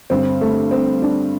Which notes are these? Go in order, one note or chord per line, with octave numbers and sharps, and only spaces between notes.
G2 D3 C4
A3
C4
D4